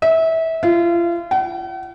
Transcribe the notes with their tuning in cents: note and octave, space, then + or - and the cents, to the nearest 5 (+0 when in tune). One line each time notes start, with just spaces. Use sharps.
E5 -25
F4 -35
F#5 +45